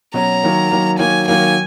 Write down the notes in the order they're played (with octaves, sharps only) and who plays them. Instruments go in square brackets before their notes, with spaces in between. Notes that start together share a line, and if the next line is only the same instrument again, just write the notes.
[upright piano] B2 F#3 C#4 F#4 [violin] A#5
[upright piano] D#3 F#3 A#3
D#3 F#3 A#3
[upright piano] D#3 F#3 A#3 [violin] G#5
[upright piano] D#3 F#3 A#3 [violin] G#5